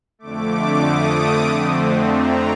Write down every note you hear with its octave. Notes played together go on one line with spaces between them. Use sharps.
F2 D3 A3 D6
D#6
F2 D3 A3 C4
A#5